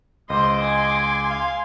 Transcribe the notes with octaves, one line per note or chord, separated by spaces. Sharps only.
C#2 C5 D#5 C6 D6
G#5 C6
F5